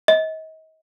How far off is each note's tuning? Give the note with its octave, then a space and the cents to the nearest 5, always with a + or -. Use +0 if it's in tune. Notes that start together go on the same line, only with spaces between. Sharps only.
D#5 +35